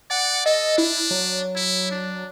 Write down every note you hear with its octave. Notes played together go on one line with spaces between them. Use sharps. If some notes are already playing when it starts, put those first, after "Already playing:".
D5 F#5
A4 D#5
D4 E4
F#3
E4
D4